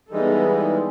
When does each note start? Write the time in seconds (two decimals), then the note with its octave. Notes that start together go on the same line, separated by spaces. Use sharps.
0.12 E3 G3 G#3 B3 D#4 G#4 A4